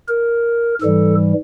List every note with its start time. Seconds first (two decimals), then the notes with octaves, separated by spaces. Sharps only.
0.08 A#4
0.81 G#2 E3 G3 A4